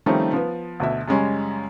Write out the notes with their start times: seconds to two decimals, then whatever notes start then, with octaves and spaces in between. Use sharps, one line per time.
0.06 D#3 F3 G3 A3 C4 C#4
0.33 F3 B3
0.80 D2 B2 E5
1.08 F#2 C#3 G3 G#3 C#4